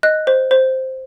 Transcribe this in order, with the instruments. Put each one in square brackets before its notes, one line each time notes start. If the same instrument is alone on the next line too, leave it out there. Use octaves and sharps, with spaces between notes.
[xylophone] D#5 F#6
C5
C5